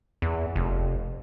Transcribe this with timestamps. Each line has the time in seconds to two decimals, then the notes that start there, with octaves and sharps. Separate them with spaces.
0.22 E2
0.56 F1